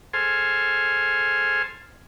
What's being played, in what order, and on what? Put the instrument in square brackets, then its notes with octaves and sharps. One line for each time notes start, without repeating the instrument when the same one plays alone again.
[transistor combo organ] G#4 A4 C5 G#5 C6 F6